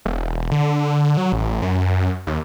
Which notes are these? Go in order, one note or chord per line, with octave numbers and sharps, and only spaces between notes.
E1
D3
F#3
A1
F#2
D#2